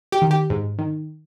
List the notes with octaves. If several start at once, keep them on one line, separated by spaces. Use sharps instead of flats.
G4
D#3
G4
G#2
D#3